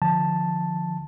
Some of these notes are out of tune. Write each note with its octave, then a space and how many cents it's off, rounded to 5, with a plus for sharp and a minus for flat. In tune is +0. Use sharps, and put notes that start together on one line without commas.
D3 +30 F3 +0 A5 +0